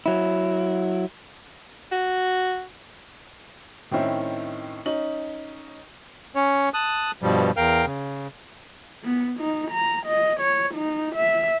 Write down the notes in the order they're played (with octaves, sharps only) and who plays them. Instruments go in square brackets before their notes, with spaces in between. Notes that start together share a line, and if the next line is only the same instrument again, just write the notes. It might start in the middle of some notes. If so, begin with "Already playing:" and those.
[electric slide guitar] F#3 E4
[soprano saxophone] F#4
[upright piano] A2 D#3 C4 C#4 E4
C#4 D#4 F#7
[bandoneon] C#4 C#5
A5 D#6 F#6
G2 B2 F3 G3
E2 A#4 F5 G5 F6
C#3
[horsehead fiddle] B3
D#4
A#5
D#5
C#5
D#4
E5